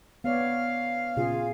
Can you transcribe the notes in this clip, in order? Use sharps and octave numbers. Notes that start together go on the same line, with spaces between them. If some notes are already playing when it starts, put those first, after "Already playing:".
B3 C#5 D5 F5
A#2 C#3 F4 G#4